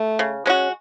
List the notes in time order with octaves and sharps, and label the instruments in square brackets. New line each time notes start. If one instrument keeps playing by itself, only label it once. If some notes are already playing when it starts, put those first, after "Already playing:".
Already playing: [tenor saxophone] A3
[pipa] C#3
G#3 C#4 F#4